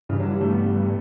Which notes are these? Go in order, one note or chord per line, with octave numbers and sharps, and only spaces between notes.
G2 C#3 E3
D3 F#3
E3 G3
F#3 A3
G3 B3